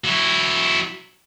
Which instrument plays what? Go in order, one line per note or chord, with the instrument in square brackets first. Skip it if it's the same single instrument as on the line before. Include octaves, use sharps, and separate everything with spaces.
[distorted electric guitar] F#3 E4